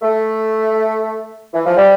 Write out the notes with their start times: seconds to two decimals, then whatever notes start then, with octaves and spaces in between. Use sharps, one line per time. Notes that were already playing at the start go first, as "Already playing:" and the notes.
0.02 A3
1.53 E3
1.66 F3
1.77 G3